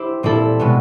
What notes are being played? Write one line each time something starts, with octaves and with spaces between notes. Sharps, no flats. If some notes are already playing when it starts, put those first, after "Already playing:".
Already playing: E4 G4 C5
A#2 G3 C4 E4 A4
B2 G#3 B3